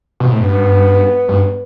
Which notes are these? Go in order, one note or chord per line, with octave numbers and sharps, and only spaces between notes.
B2
A2
G2 B3
G2